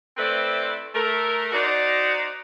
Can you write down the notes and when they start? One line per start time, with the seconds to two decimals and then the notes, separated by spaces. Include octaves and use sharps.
0.17 A3 C4 E4 B4 C5 D5
0.94 A3 A#4
1.53 D#4 F#4 C5 D5